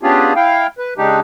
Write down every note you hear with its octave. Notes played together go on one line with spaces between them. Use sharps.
B3 C#4 D4 F4 G4 G#4
E4 F5 G5
B4
C#3 G#3 D4 D#4 G4